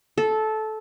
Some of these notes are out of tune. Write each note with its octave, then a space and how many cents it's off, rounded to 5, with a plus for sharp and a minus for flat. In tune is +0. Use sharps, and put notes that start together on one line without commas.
A4 -15